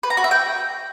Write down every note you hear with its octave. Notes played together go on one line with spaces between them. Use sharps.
B4
A#5
F#4
E5
G5